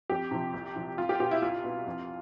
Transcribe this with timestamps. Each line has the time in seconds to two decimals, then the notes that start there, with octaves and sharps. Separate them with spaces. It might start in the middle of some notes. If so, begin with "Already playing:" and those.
0.10 F2 G4
0.31 C3 F3
0.54 C2
0.76 C3 F3
0.98 C2 F4
1.09 G4
1.19 B2 G4
1.31 E4
1.42 C2 F4
1.64 B2
1.87 F2